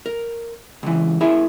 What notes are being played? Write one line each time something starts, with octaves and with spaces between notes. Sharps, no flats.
A#4
C#2 E3
E4 G#4 A#4 E5